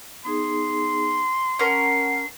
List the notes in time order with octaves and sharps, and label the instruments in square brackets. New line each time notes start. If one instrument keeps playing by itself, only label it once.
[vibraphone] B3 D#4 G#4 [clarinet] C6
[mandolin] C#4 A#4 [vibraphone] F#5 A5 [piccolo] C7